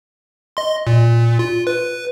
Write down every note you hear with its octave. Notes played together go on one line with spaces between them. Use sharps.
D#5 C6
A#2
F4
B4